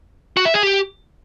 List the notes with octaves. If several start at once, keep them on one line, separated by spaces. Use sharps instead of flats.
F#4
E5
G#4
G4